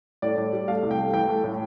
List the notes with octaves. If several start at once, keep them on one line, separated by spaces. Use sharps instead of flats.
A2 D5
A2
G3
A3 F5
C2
G5
A3
E3 G5
A3
A2